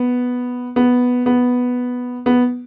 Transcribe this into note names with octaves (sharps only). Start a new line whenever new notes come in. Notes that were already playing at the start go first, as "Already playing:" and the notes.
Already playing: B3
B3
B3
B3